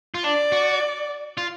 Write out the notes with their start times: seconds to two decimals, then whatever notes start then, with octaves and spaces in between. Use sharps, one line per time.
0.14 F4
0.24 D4 D5
0.52 F#4
1.38 F4